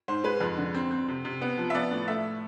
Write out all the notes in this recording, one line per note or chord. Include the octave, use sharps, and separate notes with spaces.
G#2 C5
G#3 B4
F2
D3
C4
C4
C3
C3
B3
F3
E5
B3 D5
A2
A3 E5